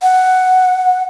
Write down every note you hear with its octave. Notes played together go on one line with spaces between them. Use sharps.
F#5